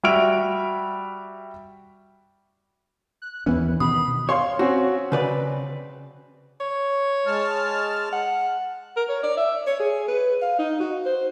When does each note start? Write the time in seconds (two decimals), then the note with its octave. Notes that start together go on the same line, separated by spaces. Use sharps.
0.03 G3 F#4 E5 F6 D7 F7
3.22 F#6
3.46 D#2 E3 B3 C#4
3.80 B2 D#3 B5 D#6
4.29 C#5 F5 C6
4.59 C4 C#4 F#4
5.12 C#3 B4 D5
6.60 C#5
7.26 G#3 A5 F6
8.13 F#5
8.96 A#4
9.09 C#5
9.23 D5
9.37 E5
9.66 C#5
9.80 G#4
10.08 B4
10.42 F5
10.59 D#4
10.80 F#4
11.05 C5